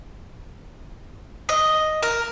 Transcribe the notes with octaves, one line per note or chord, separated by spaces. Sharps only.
D#5
A#4